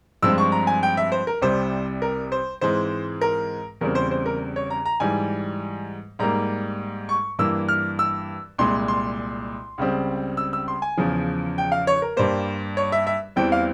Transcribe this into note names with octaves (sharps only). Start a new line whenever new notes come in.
G2 F3 G#3 C4 E6
C#6
A#5
G#5
G5
E5
C5
A#4
C2 C3 G3 C5
A#4
C5
G#2 E3 G#3 C4 C5
A#4
E2 C#3 G3 C4 A#4
C5
C5
A#4
C#5
A#5
A#5
G#2 E3 G3 G#5
G#2 G3 A#3 A#5
C#6
G2 E3 A#3 E6
F6
E6
C2 A#2 G#3 C6
C6
C#2 C#3 G3 C4
E6
E6
C6
G#5
E2 C#3 F3
G5
F5
C#5
A#4
G2 G3 A#3 C5
C#5
E5
E5
E2 E3 G3 C4 G5
F5